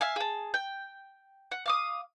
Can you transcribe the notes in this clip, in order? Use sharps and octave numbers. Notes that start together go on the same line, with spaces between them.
E5 F5 G#5
G#4 A5
G5
F#5
F5 D6 D#6